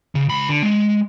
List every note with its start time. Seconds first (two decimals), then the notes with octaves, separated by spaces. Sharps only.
0.15 C#3
0.28 C#2 B5
0.49 D3
0.63 G#3